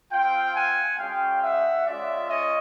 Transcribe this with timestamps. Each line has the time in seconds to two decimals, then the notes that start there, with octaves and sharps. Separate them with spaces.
0.12 C4 F4 F5 G5
0.56 F#5 G#5
0.99 G#3 C#4 F#4 F5 G5
1.42 E5 F#5
1.86 G#3 C#4 F4 D5 E5
2.30 C#5 D#5